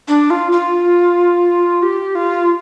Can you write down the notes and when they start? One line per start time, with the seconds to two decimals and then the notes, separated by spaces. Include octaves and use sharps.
0.08 D4
0.30 F4
0.52 F4
1.83 G4
2.15 F4